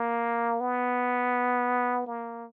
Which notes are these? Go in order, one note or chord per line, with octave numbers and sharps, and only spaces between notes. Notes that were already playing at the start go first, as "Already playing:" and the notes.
Already playing: A#3
B3
A#3